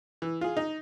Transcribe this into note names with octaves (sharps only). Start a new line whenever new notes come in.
E3
F4 G#4
D#4